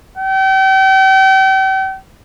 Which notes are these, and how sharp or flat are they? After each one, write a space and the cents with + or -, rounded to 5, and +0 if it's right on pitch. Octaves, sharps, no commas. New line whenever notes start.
G5 -40